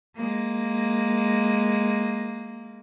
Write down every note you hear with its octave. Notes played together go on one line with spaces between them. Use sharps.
G#3 A#3